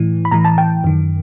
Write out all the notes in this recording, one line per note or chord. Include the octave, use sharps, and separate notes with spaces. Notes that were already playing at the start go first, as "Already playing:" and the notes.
Already playing: A2 E3
B5
A2 E3 A#5
A5
G5
F#2 D#3